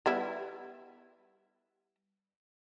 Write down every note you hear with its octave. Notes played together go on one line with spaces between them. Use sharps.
G3 B3 E4